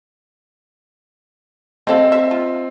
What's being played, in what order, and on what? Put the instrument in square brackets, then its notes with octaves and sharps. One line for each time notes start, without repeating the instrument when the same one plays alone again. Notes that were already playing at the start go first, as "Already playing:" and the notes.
[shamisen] G3 A4 F5 [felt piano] C4 [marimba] D#5
[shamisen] E5
F4